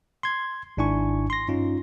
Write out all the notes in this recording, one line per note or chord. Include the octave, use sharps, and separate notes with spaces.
C6 G#6
G#1 G#2 D4 E4 G#5 C#6
C6 A#6
G2 C#4 D#4 F4